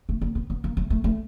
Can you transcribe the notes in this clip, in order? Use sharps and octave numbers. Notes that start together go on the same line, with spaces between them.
A3
A#3
B3
B3
A#3
A3
A3
A3